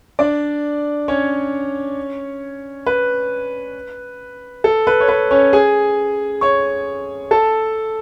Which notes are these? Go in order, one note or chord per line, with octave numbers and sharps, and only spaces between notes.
D4 D5
C#4 C#5
B4
A4
B4
C#5
B4
C#4 C#5
G#4 G#5
C#5 C#6
A4 A5